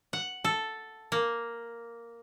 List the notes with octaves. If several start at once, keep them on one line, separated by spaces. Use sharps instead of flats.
F#5
A4
A#3